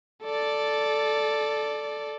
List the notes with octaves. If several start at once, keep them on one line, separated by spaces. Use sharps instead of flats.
A4 D5